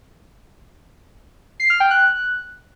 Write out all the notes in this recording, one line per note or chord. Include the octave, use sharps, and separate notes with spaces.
C7
F6
G5
F#6